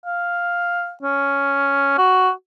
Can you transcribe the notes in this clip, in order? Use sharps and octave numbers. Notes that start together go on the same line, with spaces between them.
F5
C#4
F#4